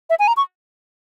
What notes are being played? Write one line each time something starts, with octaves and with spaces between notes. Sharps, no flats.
E5
G#5
A#5
C#6